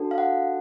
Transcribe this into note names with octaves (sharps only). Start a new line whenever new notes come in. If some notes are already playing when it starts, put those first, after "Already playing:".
Already playing: D4 F#4 A4
F5
F#5